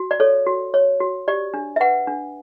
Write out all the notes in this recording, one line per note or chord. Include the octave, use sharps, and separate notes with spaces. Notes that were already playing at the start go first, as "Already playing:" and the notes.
Already playing: F#4
D5
A4 C#5
F#4
C#5
F#4
G4 D5
D4
E5
B4 F#5
D4